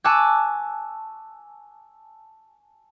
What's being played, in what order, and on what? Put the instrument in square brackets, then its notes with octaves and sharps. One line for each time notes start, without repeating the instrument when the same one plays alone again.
[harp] G#5 A5 C#6 D6 E6 F#6